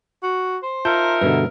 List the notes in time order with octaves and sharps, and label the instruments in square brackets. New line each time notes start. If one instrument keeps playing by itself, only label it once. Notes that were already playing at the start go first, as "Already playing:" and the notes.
[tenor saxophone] F#4
C5
[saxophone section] D#4 A#4 E5 [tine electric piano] F4 A5 G6
[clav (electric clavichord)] G2 B2 D3 [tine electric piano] B4